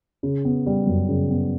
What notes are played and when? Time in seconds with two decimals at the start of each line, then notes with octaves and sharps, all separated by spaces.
0.23 C#3
0.45 B3
0.66 G3
0.87 F#2
1.09 C#3
1.30 B3